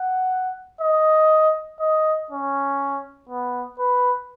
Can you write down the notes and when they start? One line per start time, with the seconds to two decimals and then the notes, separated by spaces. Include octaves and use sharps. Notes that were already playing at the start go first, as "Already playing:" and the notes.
Already playing: F#5
0.81 D#5
1.80 D#5
2.31 C#4
3.29 B3
3.79 B4